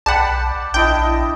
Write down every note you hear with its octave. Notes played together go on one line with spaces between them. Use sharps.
B1 D5 F#5 G5 A5 B5
A#1 D4 E4 D#5 G5